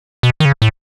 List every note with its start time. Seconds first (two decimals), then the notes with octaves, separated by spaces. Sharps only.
0.23 B2
0.40 D#3
0.45 C#3
0.62 A2